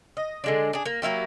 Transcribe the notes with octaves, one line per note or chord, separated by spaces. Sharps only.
D#5
D3 G#3 D4
D4 G#4
A#3
F#3 A#3 E4 G4